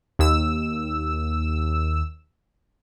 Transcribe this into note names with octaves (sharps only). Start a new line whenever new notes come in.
D#2 E6